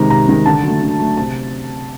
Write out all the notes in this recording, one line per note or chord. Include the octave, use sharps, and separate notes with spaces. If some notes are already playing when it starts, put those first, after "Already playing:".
Already playing: C3 D#3 G#3 A#5
C3 A#5
D#3 G#3
D3 A5
F#3 A3
D3
F#3 A3
C3 A5